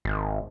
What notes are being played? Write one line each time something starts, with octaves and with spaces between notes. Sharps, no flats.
G#1